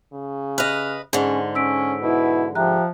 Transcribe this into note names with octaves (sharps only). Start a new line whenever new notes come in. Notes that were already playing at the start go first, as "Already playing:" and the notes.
C#3
B4 D#5 F6 F#6 F7
G#2 D3 C#4 G#4
C#4 E6 B6 D7
B2 E4
F3 G4 E5 A#5 F#6